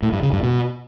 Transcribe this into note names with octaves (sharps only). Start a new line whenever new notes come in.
A2
G2
C#3
G2
B2